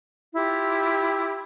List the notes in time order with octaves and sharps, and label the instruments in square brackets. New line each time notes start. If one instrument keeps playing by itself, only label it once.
[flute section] E4 F4 G4